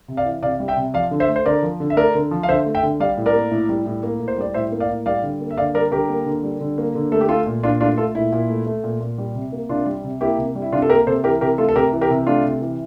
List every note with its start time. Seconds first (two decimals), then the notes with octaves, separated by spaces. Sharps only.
0.08 C3
0.17 D5 F5
0.25 E3
0.42 C3 D5 F5
0.60 G3
0.68 E5 G5
0.77 C3
0.94 F3 D5 F5
1.11 D3
1.20 C5 E5
1.28 A3
1.36 C5
1.46 D3 A#4 D5
1.63 F3
1.80 D3
1.90 E5
1.97 A3 A#4 D5
2.15 D3
2.31 F3
2.43 F5
2.49 D3 C5 E5
2.66 A3
2.75 E5 G5
2.83 D3
3.00 G3 D5 F5
3.17 A2
3.26 A#4 D5
3.35 A#3
3.51 A2
3.69 G3
3.86 A2
4.03 A#3
4.20 A2
4.28 C5
4.38 G3 D5
4.54 A2 C5 E5
4.72 A#3
4.80 D5 F5
4.88 A2
5.06 G3 D5 F5
5.23 D3
5.40 A#3
5.51 E5
5.57 D3 D5 F5
5.74 G3 A#4 D5
5.92 D3 G4 A#4
6.09 A#3
6.26 D3
6.43 G3
6.61 D3
6.78 A#3
6.95 D3
7.12 A3 A4
7.21 G4
7.29 A3 F4 A4
7.46 A#2
7.63 A#2 D4 F4
7.81 A3 D4 F4
7.97 A3 F4 A4
8.15 A#2 E4
8.32 A#2
8.49 A3
8.66 A3
8.84 A#2
9.01 A#2
9.18 G3
9.35 C3
9.52 A#3
9.69 C3 D4 F4
9.86 G3
10.04 C3
10.21 A#3 E4 G4
10.38 C3
10.55 G3
10.62 E4
10.72 C3 D4 F4
10.82 A4
10.89 A#3 G4 A#4
11.07 C3 A4 C5
11.24 E3 G4 A#4
11.41 C3 G4 A#4
11.58 A3 F4 A4
11.69 A4
11.76 C3 G4 A#4
11.93 E3
12.01 G4 A#4
12.10 C3
12.27 A3 D4 F4
12.44 C3
12.61 E3